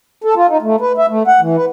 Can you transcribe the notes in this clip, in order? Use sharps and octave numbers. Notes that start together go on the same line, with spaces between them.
A4
F4
D#4
A3
B4
E5
A3
F#5
E3
B4